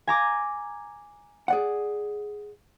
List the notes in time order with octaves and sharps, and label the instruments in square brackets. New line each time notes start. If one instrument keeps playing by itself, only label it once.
[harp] G#5 A#5 D6
[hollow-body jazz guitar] G#4 D5 F#5